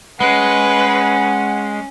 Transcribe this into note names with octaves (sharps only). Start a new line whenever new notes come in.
G#3 C#4 B4 F#5